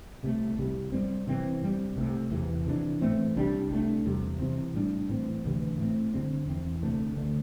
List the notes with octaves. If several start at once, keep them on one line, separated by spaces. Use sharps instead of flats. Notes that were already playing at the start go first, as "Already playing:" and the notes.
C2 C3 E3 A3
C2 C3 G3
G2 G3 C4
C3 E3 C4
G2 G3 C4
C2 C3 A3
E2 C3 E3
C3 E3 G3 D4
A2 E3 A3 C4
C2 C3 G3 D4
C2 C3 A3 D4
E2 C3 G3
C3 E3 C4
A2 G3 D4
A2 E3 C4
D2 C3 E3
A2 A3 C4
G2 D3 C4
E2 E3 C4
D2 C3 A3
D2 D3 A3